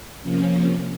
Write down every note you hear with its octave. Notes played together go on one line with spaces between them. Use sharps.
C3 F3 A#3 C#4